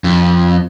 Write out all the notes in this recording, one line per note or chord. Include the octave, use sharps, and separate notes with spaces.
F2